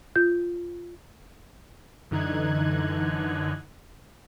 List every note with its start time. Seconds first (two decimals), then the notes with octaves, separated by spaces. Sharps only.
0.16 F4 G6
2.11 F#2 D3 E3 D#4 F#6 G#6